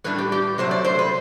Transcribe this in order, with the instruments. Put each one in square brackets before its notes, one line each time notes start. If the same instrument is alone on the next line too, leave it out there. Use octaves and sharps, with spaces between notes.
[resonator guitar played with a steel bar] A2 G3 D4 B4
G4
G4
C3 F#3 A3 C5
D5
C5
B4